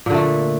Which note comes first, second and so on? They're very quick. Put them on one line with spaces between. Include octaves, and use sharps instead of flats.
A#2 D3 A3